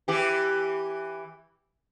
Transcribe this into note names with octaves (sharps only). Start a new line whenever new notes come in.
E3 G4